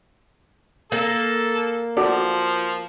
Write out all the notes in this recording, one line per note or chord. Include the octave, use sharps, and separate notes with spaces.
A#3 A4
F3 F#4 A4 D5